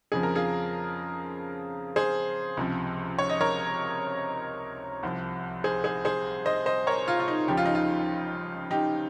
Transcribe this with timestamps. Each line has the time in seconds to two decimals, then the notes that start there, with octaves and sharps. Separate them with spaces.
0.12 F2 C#3 F3 G#4
0.23 A#4
0.35 F4 G#4
1.96 G#4 C5
2.57 C#2 C3 F3
3.19 C#5
3.29 D#5
3.41 A#4 C#5
5.03 C2 C3 F3
5.64 G#4 C5
5.84 G#4 C5
6.05 G#4 C5
6.46 C5 D#5
6.66 C5 D#5
6.87 A#4 C#5
7.08 F4
7.20 F4
7.28 D#4
7.48 C#2 C#3 F3 G4
7.57 F4
7.66 D#4
7.75 F4
8.71 D#4 G4